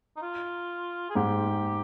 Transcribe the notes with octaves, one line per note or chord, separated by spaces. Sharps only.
D#4
F4
G#4
G#2 G4